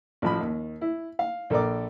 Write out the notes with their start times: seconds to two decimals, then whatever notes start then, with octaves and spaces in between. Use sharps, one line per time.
0.22 A1 F3 B5
0.41 D#2
0.81 E4
1.19 F5
1.50 A#1 A4 A#4 D5 D6